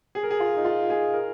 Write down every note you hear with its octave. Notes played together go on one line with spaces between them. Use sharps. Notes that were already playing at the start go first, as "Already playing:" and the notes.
G#4
A#4
G#4
F4
D#4
F4
G#4
A#4